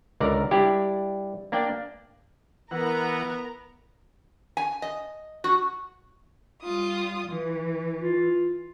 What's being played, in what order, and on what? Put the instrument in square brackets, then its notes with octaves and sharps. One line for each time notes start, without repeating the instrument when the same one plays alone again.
[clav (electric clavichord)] C#2 D3 A#4 D5 A#5
G3 D4 E4 G4 D5
A#3 D4 D5 G5
[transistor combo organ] E3 F#5 [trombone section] B3 [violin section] A#4 A#5
[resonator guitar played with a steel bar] G#5
D#5
F#4
[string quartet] G3 F4 D#6
E3
[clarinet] F4